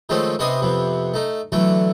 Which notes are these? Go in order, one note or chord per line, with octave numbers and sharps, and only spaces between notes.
D#3 F3 G#3 A3 C4 C#4
C3 B3 D4 C5 D#5 G#5
F2 C3 B3
A3 D#4
D3 E3 F#3 A3